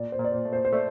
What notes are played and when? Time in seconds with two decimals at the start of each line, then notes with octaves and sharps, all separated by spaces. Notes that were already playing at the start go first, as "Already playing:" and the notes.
Already playing: A#2 D5
0.12 C5
0.19 A#2
0.24 D5
0.32 C5
0.45 A3
0.53 C5
0.65 C5
0.73 A3 D5